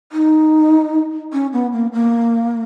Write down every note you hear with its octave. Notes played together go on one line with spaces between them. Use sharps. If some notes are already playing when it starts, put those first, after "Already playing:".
D#4
C#4
B3
A#3
A#3